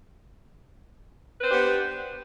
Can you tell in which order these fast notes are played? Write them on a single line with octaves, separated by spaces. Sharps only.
B4 C5 D4 G4 B3